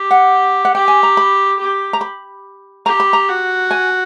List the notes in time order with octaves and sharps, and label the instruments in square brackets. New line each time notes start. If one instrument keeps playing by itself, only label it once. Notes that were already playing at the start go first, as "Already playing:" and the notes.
Already playing: [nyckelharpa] G4
[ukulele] F#5
F#5
[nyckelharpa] G4 [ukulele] G5
[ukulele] G#5
A#5
B5
[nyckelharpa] G4
[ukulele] A#5
B5
[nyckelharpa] G4 [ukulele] A#5
[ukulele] B5
A#5
[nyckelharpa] F#4
[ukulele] G#5